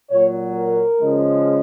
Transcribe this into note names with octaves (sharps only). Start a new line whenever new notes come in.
A#2 F#3 C#5
A#4
C#3 F3 G#3